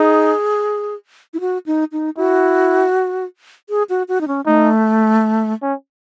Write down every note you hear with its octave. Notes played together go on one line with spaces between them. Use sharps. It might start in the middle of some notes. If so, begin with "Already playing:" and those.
Already playing: D#4 G#4
E4
F#4
D#4
D#4
E4 F#4
G#4
F#4
F#4
D#4
C#4
A3 D#4
C#4